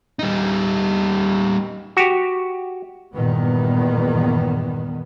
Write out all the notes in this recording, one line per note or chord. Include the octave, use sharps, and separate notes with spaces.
G3 D#4
F#4 G4
E2 G2 A#2 D#3 B3